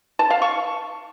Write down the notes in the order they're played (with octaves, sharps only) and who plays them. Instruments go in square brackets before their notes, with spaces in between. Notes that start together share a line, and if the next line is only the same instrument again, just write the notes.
[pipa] A5
F5
C#6